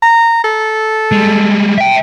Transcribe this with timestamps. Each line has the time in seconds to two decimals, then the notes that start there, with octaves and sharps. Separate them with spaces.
0.03 A#5
0.44 A4
1.12 G3 G#3
1.78 E5 G5